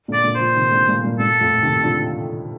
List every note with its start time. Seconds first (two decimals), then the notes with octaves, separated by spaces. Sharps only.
0.08 A#2 D3
0.13 D5
0.24 A#2 D3
0.35 D3 F3 C5
0.56 C3 D#3
0.71 A#2 D3
0.88 G2 A#2
1.04 G2 A#2
1.19 G2 A#2 A4
1.41 F2 A2
1.62 C3 D#3
1.83 D3 F3